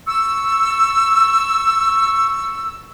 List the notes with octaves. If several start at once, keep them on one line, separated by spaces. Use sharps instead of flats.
C#6 E6